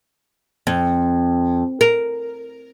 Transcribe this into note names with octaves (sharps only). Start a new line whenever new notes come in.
F2
A#4